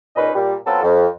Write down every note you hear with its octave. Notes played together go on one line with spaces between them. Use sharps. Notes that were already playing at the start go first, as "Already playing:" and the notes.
C#2 A#2 C#4 D#4 B4 D#5
A#2 G3
F#3 B3 C4 F4 A4
F2